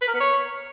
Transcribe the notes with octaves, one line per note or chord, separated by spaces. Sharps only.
B4
A#4
B3
C#5